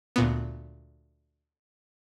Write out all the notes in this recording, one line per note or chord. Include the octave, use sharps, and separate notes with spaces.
D2 A#2 B3